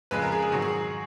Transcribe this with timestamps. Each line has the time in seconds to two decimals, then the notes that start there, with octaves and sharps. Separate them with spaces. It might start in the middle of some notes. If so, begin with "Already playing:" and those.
0.11 F2 C#3 G#3 B4
0.22 A#4
0.32 G#4
0.42 G#4
0.52 G#2 D#3 F#3 F#4
0.62 G#4